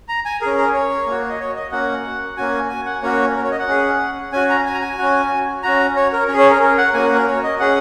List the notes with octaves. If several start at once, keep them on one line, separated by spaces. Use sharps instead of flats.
A#5
G#5
C#4 G#4 A#4
A#4
C#5
A#3 F#4
D#5
C#5
D#5
A#3 C#4 F#4 F#5
A#3 C#4 F#4 G#5
G#5
F#5
A#3 C#4 F#4 C#5
A#4
C#5
D#5
F#5
C#4 G#4
C#4 F#4 G#5
A#5
G#5
A#5
G#5
C#4 F#4
C#4 F#4 A#5
C#5
A#4
C#4 G#4 C#5
C#5
A#4
A#4
F#5
A#3 C#4 F#4 G#5
A#4
C#5
D#5
C#4 G#4 F#5